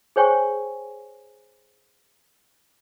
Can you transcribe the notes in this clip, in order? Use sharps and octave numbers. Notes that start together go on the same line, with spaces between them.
G#4 C5 C#5 G5 G#5 C#6